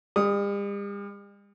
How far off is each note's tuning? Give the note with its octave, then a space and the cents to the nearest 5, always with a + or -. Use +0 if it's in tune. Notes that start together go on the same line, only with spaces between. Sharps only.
G3 +45 D#6 +0